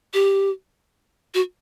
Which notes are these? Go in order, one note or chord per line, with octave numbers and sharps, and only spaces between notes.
G4
F#4